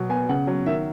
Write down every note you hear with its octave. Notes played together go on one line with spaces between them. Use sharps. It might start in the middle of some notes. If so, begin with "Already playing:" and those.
Already playing: B2 F#3
B3 G#5
C#3 F#5
F#3
D#3 E5